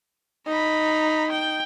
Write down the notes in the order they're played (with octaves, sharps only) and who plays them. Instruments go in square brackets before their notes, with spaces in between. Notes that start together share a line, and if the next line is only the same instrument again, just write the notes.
[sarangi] D#4 [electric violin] A#5 B5
[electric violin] G5 G6